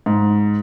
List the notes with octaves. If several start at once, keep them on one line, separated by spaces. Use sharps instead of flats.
G#2